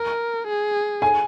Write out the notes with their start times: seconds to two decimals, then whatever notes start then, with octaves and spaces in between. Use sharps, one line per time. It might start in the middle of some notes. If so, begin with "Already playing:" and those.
Already playing: A#4
0.47 G#4
1.02 G#5